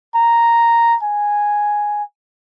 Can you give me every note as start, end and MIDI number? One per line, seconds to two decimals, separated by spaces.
0.15 0.96 82
1.03 2.03 80